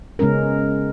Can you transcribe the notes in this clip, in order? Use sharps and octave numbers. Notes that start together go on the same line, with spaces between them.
C#3 G#3 B3 C#4 A#4